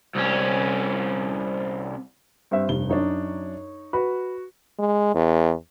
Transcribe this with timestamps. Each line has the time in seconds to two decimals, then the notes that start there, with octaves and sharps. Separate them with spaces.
0.15 C2 C#4
2.51 G2 C4 E5
2.69 F1 G2 G7
2.89 F#2 D4 D#4 C#5
3.93 F#4 B4
4.79 G#3
5.15 E2